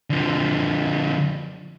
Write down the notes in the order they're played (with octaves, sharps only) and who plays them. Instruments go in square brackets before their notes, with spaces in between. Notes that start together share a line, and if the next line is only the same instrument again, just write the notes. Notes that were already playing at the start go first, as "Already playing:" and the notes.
[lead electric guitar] D3 F3